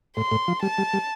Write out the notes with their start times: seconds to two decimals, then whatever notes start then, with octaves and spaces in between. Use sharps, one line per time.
0.17 A2 C6
0.31 A2
0.48 F3
0.62 G3 A5
0.78 G3
0.93 G3